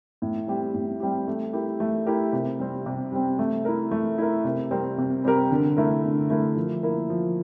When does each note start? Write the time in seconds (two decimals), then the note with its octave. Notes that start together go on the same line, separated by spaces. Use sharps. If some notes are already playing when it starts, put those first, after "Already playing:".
0.22 A2
0.48 G3 C4 G4
0.74 A2
1.00 G3 C4 G4
1.28 A3
1.53 E4 G4 A#4
1.80 A3
2.06 E4 G4 A#4
2.33 C3
2.59 G3 C4
2.86 C3
3.12 G3 C4
3.39 A3
3.65 E4 A#4
3.92 A3
4.18 E4 A#4
4.45 C3
4.71 G3 C4 G4 A#4
4.98 C3
5.24 G3 C4 G4 A#4
5.51 D3
5.77 A3 E4 A#4
6.04 D3
6.30 A3 E4 A#4
6.56 F3
6.83 A#3 E4 A#4
7.10 F3